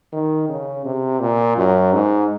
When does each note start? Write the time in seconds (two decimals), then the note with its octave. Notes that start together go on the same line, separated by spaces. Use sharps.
0.12 D#3
0.49 C#3
0.85 C3
1.20 A#2
1.57 F#2
1.93 G#2